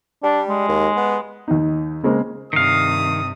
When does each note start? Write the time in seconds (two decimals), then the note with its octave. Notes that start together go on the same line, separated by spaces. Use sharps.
0.23 G3 D4
0.49 G#3
0.68 D#2
0.96 B3
1.48 D#2 D#4
2.03 C#3 G#3 A#3 C4
2.53 G2 C3 D#3 F5 D#6